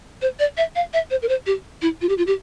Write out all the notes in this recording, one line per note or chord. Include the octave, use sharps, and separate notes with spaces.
C5
D5
E5
F5
E5
C5
A#4
C5
G4
E4
F4
G4
F4
G4